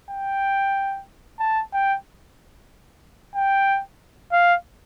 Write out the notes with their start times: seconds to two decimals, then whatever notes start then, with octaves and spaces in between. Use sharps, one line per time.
0.10 G5
1.40 A5
1.73 G5
3.36 G5
4.32 F5